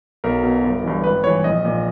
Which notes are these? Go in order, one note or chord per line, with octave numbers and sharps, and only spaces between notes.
B1 A#4
B2
G1
G2 E3
G#1 B4
G2 E3 C#5
A#1 D#5
A#2